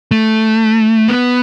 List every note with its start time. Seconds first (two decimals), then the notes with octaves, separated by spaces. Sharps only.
0.11 A3
1.08 B3